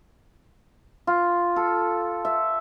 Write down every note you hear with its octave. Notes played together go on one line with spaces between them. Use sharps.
F4
A4
E5